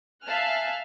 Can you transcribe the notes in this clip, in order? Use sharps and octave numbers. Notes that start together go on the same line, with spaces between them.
E5 F5 G#5 A5 F6 F#6